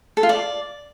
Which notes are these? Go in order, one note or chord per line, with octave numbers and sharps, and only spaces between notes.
A4
F4
D5